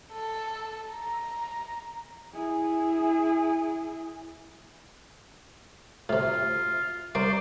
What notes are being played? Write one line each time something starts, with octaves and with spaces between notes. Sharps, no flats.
A4
A#5
E4 G#4
A2 C3 F4
C2 A#4 C5 D5 C#6